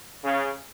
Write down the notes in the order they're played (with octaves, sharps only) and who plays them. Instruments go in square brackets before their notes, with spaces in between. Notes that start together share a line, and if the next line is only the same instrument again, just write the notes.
[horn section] C#3